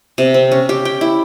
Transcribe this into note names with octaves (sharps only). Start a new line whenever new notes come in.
C3
C4
C#4
G4
G5
E4